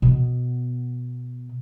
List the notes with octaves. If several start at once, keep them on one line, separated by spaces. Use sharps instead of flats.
B2 B3